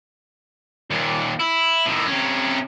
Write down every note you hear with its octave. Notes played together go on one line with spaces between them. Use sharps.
D#2 A#2
E4
A2 D#3
C3 C#4